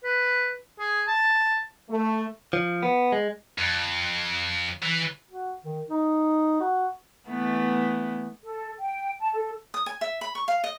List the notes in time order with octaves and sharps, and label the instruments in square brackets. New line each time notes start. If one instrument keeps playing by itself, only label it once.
[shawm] B4
G#4
A5
[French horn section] A3
[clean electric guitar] F3
B3
G#3
[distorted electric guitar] F2
E3
[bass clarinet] F#4
D#3
D#4
F#4
[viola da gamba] E3 A3 B3
[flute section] A4
G5
A5
A4
[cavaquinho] D#6
G#5
E5
B5
C#6
F5
D#5